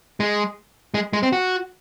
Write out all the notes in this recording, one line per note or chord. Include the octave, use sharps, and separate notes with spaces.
G#3
G#3
G#3
C4
F#4